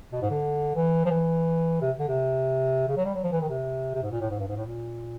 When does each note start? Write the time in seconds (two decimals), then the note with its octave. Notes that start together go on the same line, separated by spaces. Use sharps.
0.13 B2
0.22 G#2
0.31 D3
0.75 E3
1.06 F3
1.11 E3
1.82 C3
1.99 D3
2.08 C3
2.88 C#3
2.97 F#3
3.05 G3
3.15 F#3
3.24 F3
3.32 E3
3.41 D#3
3.50 C3
3.95 C3
4.03 G#2
4.12 A#2
4.21 A2
4.31 G#2
4.39 G2
4.48 G#2
4.57 A2
4.65 A#2